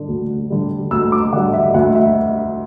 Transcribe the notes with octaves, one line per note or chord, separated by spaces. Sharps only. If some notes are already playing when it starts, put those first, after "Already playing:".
Already playing: D3 G3
D2
D3 G3
D2 E6
D6
D3 G3 F#5
E5
D2 F#5
E5